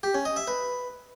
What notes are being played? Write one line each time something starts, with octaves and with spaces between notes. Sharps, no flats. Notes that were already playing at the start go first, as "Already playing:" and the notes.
G4
C#4
D#5
E5
B4